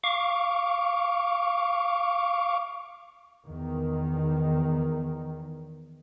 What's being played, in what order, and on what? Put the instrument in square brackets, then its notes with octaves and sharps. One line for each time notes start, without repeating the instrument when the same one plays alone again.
[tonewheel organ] F5 C#6 D6
[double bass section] E2 D#3